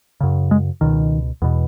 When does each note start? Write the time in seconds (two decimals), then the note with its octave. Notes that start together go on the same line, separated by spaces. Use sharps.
0.21 F#2 C#3
0.51 G#3
0.81 C#2 B2 D#3
1.42 E2 B2